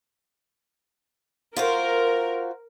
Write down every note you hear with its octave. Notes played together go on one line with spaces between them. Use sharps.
F4 F#4 A#4 C5